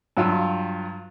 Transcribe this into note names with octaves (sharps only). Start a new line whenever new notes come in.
G2 F#3 F4 E6